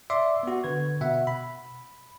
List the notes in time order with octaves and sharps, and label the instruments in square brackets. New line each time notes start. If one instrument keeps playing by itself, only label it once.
[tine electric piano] D5 E5 C6 D6
B3 F#4
D3 B4 G#6
B2 E5 F#5
B5